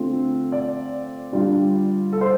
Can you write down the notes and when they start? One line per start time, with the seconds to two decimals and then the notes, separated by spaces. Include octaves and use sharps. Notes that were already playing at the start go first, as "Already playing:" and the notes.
Already playing: D3 A3 C4 F4
0.52 D5
1.32 D3 G3 D4 F4
2.13 A4
2.21 C5